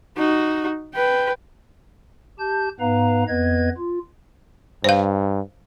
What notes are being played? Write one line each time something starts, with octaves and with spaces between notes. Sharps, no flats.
D#4 F#4
B4 G5
G4 A5 G6
G#2 B3 B4 F5 A#5
F2 B3 B4 D#5 G#6
F4
G2 C5 F5